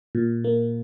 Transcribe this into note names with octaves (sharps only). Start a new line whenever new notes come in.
A#2
A#3